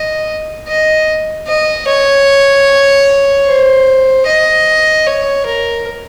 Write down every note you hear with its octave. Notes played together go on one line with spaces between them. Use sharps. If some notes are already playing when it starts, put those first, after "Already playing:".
Already playing: D#5
D#5
D#5
C#5
C5
D#5
C#5
A#4